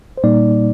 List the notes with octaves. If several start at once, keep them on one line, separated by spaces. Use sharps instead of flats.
C5
A#2 G3 A#3 D#4 D5